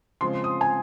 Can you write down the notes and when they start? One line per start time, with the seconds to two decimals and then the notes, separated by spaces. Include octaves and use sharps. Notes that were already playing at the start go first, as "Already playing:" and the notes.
0.21 C#3 F3 G#3 C4 C6
0.44 D#6
0.61 G#5